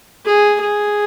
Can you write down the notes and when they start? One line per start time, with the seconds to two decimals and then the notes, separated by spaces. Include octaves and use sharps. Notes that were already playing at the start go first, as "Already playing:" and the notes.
0.26 G#4
0.61 G#4